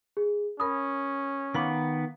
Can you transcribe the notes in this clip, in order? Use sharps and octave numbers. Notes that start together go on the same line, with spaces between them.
G#4
C#4 A#4 B5 D#6
D#3 B3 F5 B5 D6